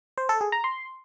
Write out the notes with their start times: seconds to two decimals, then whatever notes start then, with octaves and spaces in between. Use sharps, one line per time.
0.18 C5
0.29 A4
0.41 G#4
0.52 A#5
0.64 C6